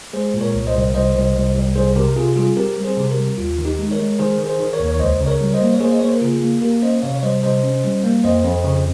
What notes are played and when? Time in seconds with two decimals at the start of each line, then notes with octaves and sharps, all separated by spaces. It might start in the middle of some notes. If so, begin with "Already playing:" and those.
0.13 G#3 G#4 C5
0.34 A#2
0.41 A#4 C#5
0.54 C2
0.67 C5 D#5
0.75 C2
0.94 C2 C5 D#5
1.15 C2
1.36 C2
1.55 C2
1.76 C2 G#4 C5
1.96 C3 G4 A#4
2.16 C3 F4 G#4
2.36 G3 F4 G#4
2.57 C4 G4 A#4
2.78 G3
2.84 G#4 C5
2.97 C3
3.11 G4 A#4
3.17 G3
3.38 D#2 F4
3.58 D#3
3.65 D#4 G4
3.79 G#3
3.91 A#4 C#5
3.99 G#3
4.19 D#3 G#4 C5
4.39 D#3
4.46 G#4 C5
4.60 D#3
4.73 A#4 C#5
4.80 D#2
4.88 C#5
4.99 C#2 C5 D#5
5.21 C#3
5.26 A#4 C#5
5.41 G3
5.54 C5 D#5
5.61 A#3
5.74 C#5
5.80 A#3 G#4 C5
5.92 D#5
5.99 C#5
6.02 A#3 C5
6.14 A#4
6.21 C#3 F4 G#4
6.42 A#3
6.62 A#3 G4 A#4
6.82 C#4 C5 D#5
7.02 C3 C#5 F5
7.16 C#5
7.23 G3 C5 D#5
7.43 C3 C5 D#5
7.63 C#4
7.84 G3
8.04 A#3
8.24 F2 C5 D#5
8.44 F2
8.64 C#3